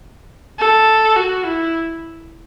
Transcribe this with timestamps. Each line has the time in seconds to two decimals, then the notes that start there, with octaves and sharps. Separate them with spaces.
0.59 A4
1.16 F#4
1.45 E4